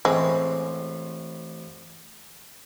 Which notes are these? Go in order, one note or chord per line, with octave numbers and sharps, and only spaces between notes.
A1 G#3 C4